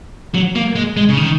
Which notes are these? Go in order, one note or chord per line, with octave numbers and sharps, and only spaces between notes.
F#3
A#3
G#3
G#3
C#3
D#3